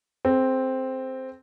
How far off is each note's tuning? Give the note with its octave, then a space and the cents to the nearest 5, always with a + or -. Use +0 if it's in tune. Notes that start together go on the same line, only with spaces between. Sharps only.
C4 +0 G#4 +45